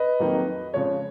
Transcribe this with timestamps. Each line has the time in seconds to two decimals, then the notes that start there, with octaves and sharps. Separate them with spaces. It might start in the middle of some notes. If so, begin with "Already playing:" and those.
Already playing: B4 D#5
0.19 F2 D#3 F#3 A#3 D#4
0.73 C#3 F3 G#3 C#5